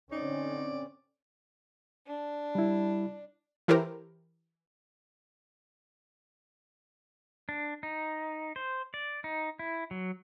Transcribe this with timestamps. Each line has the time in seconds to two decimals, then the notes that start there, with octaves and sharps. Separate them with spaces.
0.12 D3 C4 C#4 D#4 D5
2.07 D4
2.55 G3 E4
3.68 E3 E4 G4 A4 A#4 C5
7.49 D4
7.83 D#4
8.56 C5
8.94 D5
9.24 D#4
9.59 E4
9.91 F#3